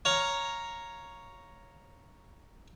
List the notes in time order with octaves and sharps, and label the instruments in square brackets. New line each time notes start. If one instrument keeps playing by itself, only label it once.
[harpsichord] C#5 F5 A#5